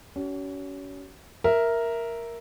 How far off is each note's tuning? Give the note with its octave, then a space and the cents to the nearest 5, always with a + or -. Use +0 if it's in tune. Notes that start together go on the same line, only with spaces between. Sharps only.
C#4 +30 F#4 +40
A#4 +0 E5 +0